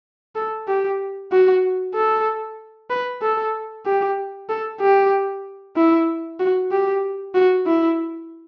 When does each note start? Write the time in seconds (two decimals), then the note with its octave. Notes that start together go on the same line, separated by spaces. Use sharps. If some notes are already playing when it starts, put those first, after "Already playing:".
0.35 A4
0.68 G4
1.32 F#4
1.95 A4
2.90 B4
3.22 A4
3.85 G4
4.49 A4
4.81 G4
5.76 E4
6.40 F#4
6.71 G4
7.35 F#4
7.66 E4